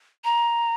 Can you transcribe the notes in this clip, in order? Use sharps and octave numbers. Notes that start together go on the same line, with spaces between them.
A#5